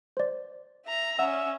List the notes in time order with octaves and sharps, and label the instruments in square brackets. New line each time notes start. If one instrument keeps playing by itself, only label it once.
[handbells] C5 D5
[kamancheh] E5 A#5
[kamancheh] C#4 [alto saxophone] E5 [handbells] F#5